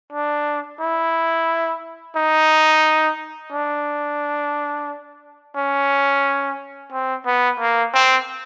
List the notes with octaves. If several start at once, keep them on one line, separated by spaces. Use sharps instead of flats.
D4
E4
D#4
D4
C#4
C4
B3
A#3
C4